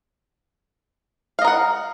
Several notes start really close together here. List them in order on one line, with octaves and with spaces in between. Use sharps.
F5 D#5 A#4 F#5